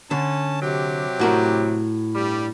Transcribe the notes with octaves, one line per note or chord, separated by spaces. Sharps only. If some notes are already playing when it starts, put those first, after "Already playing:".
D3 C#4 A5
C3 F#3 G4
A2 F#4 A#4
G2 G3